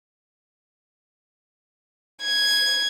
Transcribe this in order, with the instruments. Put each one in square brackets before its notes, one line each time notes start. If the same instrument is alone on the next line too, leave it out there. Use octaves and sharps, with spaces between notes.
[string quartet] G#6